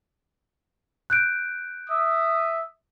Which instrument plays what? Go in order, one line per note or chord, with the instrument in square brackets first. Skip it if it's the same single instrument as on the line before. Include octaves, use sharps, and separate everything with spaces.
[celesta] F#6 G6 D7
[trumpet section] E5 D#6